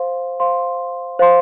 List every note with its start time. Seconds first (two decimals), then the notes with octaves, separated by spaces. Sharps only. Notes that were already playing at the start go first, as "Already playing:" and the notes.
Already playing: C5 F5 C6
0.40 C5 F5 C6
1.19 C5 F5 C6